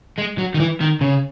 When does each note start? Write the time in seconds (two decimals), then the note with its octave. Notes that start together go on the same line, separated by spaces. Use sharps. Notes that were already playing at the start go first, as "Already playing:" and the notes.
0.18 G#3
0.38 F#3
0.54 D#3
0.60 E3
0.81 D#3
1.01 C#3